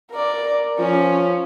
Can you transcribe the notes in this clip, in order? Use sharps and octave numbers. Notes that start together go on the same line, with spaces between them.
A#4 D5
F3 C#4